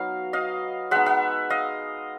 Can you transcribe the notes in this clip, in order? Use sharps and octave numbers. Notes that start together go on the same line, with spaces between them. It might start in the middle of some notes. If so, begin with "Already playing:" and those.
Already playing: F#3 B3 D#4 F5
D#5 F5
G#3 B3 D#4 E5 F#5
E5 F#5
D#5 F5